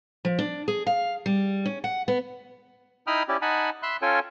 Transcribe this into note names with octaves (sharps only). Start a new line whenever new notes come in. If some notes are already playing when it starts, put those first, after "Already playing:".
F3
D4
G#4
F5
G3
C#4
F#5
B3
D#4 E4 G5 B5 D#6 F6
C#4 E4 G4 D5
D#4 F#5 G#5 A5 B5
E5 B5 C6 F#6
C#4 F4 A4 C#5 G5 G#5